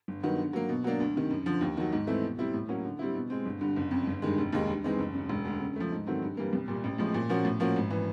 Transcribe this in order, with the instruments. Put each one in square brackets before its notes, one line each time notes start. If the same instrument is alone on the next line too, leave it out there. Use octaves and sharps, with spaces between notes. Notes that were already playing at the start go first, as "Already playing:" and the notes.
[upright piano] G1
G2 D#3 F#3 B3
D3
F#3 A#3
B2
F#3 A#3 D4
D2
C3 D#3
F#2
D3 F3
D#2
D#3 F#3
G#2
E3 A3 C4 E4
B2
G3 C4 E4
A2
F#3 A#3 C#4
D3
G3 C4 E4
B2
G#3 C4
G1
G2 D3
F#1
F2 C#3
G1
G2 D#3 G#3
F1
D#2 D#3 G#3
G2
E3 G#3 C4 D#4
F#1
F#2 C#3
E1
D2 D3
C#3
F3 A3
G#2
D#3 F#3 A3 C4
G2
E3 G3 A#3
C2
A#2 G3
A1
A2 F3 G#3
A#2
F3 A#3 C#4 F#4
A2
F3 A#3 C#4 F#4
G#1
E3